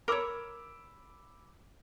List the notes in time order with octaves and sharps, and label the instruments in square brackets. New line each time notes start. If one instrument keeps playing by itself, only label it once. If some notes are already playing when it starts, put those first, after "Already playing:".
[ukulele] A#4 C#5 [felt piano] B5 D6 E6